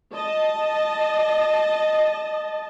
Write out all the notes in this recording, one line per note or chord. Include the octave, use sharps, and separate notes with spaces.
D#5 A5